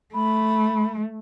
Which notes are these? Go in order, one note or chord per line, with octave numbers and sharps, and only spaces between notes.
A3 B5